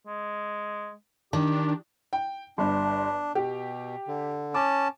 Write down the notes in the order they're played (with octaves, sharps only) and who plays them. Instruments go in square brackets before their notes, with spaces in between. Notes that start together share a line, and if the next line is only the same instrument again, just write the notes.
[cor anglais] G#3
[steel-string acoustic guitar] D#3 [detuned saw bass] D4 [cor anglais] G4
[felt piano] G5
[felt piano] G1 G2 [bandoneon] D4
[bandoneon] B2 [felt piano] G4
[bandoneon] D3
[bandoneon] C#4 A5 [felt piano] D6